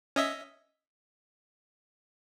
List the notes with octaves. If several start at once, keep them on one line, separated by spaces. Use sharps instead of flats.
C#4 D#5 E5